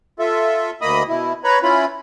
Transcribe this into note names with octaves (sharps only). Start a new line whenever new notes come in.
F4 A4 E5
D2 A#3 D#5 B5 D#6
B2 E4
B4 C#5 A#5 B5
C#4 E4 F4 B5